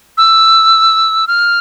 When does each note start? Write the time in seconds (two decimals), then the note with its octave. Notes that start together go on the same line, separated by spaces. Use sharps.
0.17 E6
1.28 F6